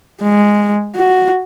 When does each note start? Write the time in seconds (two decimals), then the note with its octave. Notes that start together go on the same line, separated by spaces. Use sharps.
0.22 G#3
0.95 F#4